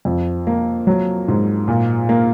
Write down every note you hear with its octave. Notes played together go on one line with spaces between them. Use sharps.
F2
A#3
F#3
G#2
A#2
A#3